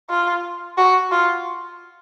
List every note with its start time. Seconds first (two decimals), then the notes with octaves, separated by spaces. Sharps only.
0.10 F4
0.78 F#4
1.11 F4